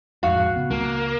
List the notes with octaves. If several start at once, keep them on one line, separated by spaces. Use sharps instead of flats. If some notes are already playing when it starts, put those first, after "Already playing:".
A1 F2 G#2 F#4 F5
C#3 B3
C#2 A#3